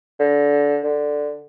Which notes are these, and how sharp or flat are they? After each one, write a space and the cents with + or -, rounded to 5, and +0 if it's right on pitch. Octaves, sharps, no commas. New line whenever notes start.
D3 -20
D3 +5